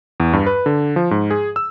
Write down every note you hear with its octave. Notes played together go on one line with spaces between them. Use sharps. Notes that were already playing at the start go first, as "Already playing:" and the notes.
E2
G2
B4
D3
F3
G#2
G#4
E6